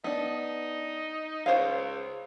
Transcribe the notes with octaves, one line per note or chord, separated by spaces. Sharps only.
B3 D4 D#4
C#2 C5 C#5 F5